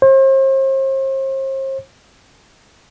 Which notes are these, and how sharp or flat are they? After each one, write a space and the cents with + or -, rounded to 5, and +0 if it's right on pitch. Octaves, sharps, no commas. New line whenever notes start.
C5 +40